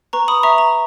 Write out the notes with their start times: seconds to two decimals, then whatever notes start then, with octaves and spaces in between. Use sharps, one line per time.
0.13 B4 A#5 C#6
0.28 B5 D#6
0.43 E5 A#5 C#6
0.58 A#5